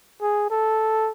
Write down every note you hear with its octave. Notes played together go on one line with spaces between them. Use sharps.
G#4
A4